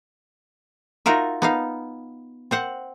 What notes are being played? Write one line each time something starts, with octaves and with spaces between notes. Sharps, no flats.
D#4 F4 F#4 A#4 E5
B3 D#4 F5
C4 C5 F#5